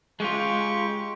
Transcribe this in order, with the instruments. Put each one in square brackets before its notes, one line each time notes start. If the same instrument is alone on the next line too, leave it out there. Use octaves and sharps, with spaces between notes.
[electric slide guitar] G#3 F4 [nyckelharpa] G4 C#6